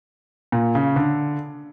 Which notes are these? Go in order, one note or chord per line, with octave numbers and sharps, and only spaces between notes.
A#2
C#3
D3